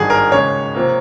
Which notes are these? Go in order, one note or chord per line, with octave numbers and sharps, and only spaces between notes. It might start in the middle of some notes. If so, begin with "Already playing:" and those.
Already playing: G#1 G2 D#3 G#4
A#4
D#2 C#3 G#3 C#5
C3 F3 A#3